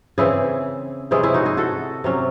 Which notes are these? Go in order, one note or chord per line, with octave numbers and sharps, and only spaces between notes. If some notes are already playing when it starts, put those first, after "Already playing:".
C#3 E3 C4 E4 G#4
C3 E3 G#3 C#4 E4 G#4
E4 G#4
D#4 F#4
E4 G#4
F#4 A4
C3 F#3 C#4